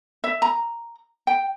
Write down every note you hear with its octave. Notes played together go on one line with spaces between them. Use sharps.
E5
A#5
G5